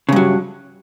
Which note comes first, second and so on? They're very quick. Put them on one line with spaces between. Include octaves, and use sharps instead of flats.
C#3 G2 F#3